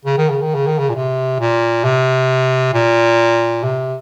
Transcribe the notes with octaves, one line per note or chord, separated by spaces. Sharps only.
C#3
D#3
C#3
D#3
C#3
D#3
C#3
A#2
C3
A#2
C3
A#2
C3